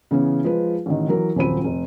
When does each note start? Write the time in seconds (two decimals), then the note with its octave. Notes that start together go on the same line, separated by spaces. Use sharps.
0.11 C#3 E3 B3 C#4
0.44 F3 G#3 F4 G#4 B4
0.86 A1 D#3
1.08 E3 F#3 A#4
1.36 D#1 F#2 F3 C4 B5 D#7
1.64 F1